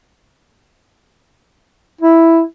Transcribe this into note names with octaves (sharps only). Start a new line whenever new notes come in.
E4